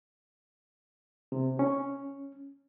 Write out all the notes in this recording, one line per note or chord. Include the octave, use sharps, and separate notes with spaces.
C3
C#4